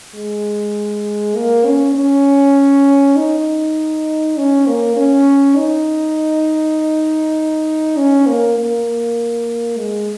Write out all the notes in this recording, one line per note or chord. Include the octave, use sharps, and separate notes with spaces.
G#3
A#3
C#4
C#4
D#4
C#4
A#3
C#4
D#4
C#4
A#3
A#3
G#3